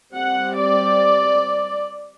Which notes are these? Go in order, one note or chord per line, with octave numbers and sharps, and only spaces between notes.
G3 C4 F#5
D5